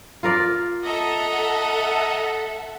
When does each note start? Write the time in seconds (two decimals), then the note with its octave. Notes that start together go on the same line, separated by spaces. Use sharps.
0.23 F4 A#4 D5
0.83 A4 D#5 E5 F#5 A#5